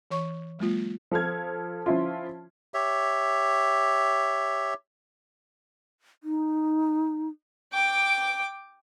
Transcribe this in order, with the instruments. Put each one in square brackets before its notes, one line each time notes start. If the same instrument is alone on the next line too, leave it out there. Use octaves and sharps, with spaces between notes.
[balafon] E3 C#5 C#6
F#3 G#3 A#3 F4
[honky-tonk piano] F3 A4 F6 G#6
F3 C#4 E4 F4
[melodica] G4 C#5 E5
[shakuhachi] D#4
[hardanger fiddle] G5 D6